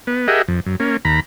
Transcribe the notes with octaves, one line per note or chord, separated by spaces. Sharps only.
B3
G4 G#4 A#4 D#5 E5 F#5
F2
F#2
A#3 C#4
D#2 A#5 B5